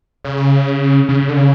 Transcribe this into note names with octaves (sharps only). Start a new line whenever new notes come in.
C#3
C#3
D3
C#3